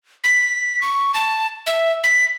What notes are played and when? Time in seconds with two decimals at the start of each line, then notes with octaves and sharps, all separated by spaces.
0.24 B6
0.82 C#6
1.14 A5
1.67 E5
2.04 B6